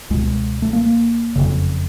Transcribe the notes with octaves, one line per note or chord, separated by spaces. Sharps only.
C#2 B2 G#3
A3
A#3
F#1 F2 C#3